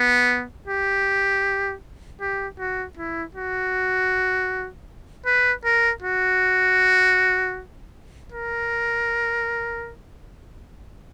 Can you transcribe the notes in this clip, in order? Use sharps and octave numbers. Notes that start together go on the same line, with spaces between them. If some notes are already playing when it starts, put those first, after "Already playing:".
Already playing: B3
G4
G4
F#4
E4
F#4
B4
A#4
F#4
A#4